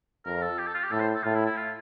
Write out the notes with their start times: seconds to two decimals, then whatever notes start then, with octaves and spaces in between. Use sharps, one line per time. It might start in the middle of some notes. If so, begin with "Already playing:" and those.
0.26 F2 A#4
0.42 A4
0.59 G4
0.67 A4
0.75 F4
0.83 G4
0.91 A2 A4
1.00 C5
1.15 A4
1.24 A2 F4
1.34 E4
1.46 E4
1.57 F4